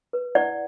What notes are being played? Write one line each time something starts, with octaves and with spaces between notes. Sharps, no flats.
B4
E4 D5 F#5